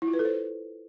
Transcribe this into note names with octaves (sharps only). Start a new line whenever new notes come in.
E4
F4
B4
A4
C5